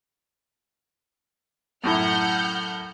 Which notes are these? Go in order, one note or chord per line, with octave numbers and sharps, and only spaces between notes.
F#2 A2 E4 F#5 F6 G6